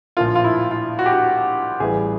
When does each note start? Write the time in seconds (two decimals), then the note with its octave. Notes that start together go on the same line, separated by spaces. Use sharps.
0.17 A#1 A2 F3 A#3 F4
0.35 F4
0.44 E4
0.71 F4
0.99 F#4
1.06 G4
1.13 F#4
1.80 A1 A2 E3 G3 G#4